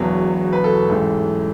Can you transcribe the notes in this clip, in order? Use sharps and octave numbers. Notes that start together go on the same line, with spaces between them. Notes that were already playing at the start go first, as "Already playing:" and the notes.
Already playing: E1 E2 B2 F#3 B4
B4
A4
A1 G#2 E3